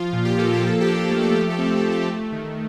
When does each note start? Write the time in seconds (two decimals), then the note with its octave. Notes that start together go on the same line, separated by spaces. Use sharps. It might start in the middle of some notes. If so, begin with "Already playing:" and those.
Already playing: F3 F4
0.13 A#2
0.25 G4
0.37 A#3 A4
0.53 G4
0.63 F3 A4
0.81 G4
0.87 D4
0.95 A4
1.08 A3 G4
1.22 A4
1.34 F3 G4
1.50 A4
1.59 C4
1.64 G4
1.77 A4
1.83 A3
1.92 G4
2.08 A3
2.32 D#3